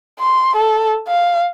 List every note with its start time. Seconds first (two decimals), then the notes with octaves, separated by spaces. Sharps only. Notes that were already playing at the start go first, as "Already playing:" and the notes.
0.20 C6
0.56 A4
1.08 F5